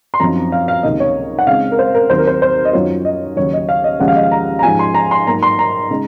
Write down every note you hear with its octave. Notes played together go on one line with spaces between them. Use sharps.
C6
F#2 F3 C4 D#4 A#5
F5
F5
C#2 C3 D#3 A#3 C#4 D#5
C#5
F#5
C#3 G#3 C4 D#4 F5
A#4
C5
A#4
D#2 D#3 F#3 C4 C5
A#4
C5
C5
D#5
F#2 D#3 F#3 C#4 F4 C#5
D#5
D#2 C#3 F#3 C#5
D#5
F5
D#5
D#2 C#3 F3 G#3 C#4 F#5
F5
D#5
F5
A#5
A#5
G#2 F3 G#3 C#4 F4 G#5
C6
A#5
C6
G#2 F#3 A#3 A#5
C6
A#5
C#3 G#3 D#4